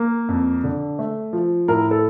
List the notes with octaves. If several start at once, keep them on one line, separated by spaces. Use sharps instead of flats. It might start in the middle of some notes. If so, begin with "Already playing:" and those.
Already playing: A#3
F2
D3
A3
F3
A2 A#4
A4